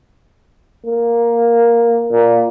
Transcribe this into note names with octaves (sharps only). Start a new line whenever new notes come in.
A#3
A#2